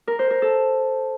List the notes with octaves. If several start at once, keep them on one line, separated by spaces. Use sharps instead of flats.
A#4
C5
A#4
A4